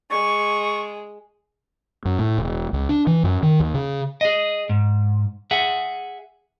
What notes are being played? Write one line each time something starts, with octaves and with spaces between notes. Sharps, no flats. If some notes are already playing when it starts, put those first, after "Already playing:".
G#3 C#6
F#2
A2
E1
C#2
D4
E3
F#2
D#3
D#2
C#3
G#4 D#5
G#2
G#4 E5 F#5